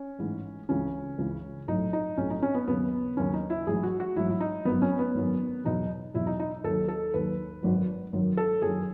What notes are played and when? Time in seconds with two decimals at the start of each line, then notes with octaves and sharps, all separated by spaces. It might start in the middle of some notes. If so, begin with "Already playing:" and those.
Already playing: C#4
0.19 A1 G#2 E3
0.69 C#2 C#3 E3 C#4
1.18 C#2 C#3 E3
1.68 B1 A2 F#3 D#4
1.93 D#4
2.17 B1 A2 F#3 C#4
2.30 D#4
2.43 C#4
2.55 B3
2.67 D#2 C#3 F#3 B3
3.17 D#2 C#3 F#3 C#4
3.34 D#4
3.50 E4
3.67 A1 G#2 F#3 G#4
3.83 F#4
4.00 F#4
4.16 A1 G#2 F#3 E4
4.30 E4
4.40 D#4
4.65 G#1 F#2 D#3 F#3 B3
4.82 C#4
4.99 B3
5.15 G#1 F#2 D#3 F#3
5.65 E2 B2 F#3 D#4
6.14 E2 B2 F#3 E4
6.27 D#4
6.39 D#4
6.64 D#2 D#3 F#3 A4
6.88 A4
7.14 D#2 D#3 F#3 B4
7.63 G#1 F#2 D#3 F#3
8.13 G#1 F#2 D#3 F#3
8.37 A4
8.62 F#1 F#2 D#3 F#3 G#4